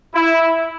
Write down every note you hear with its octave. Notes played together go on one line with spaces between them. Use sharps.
E4